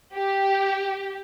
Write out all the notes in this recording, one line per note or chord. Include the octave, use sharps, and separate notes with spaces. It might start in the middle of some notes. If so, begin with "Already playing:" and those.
G4